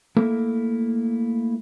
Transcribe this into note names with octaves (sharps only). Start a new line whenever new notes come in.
A3 A#3 E4 A4 A#4 E5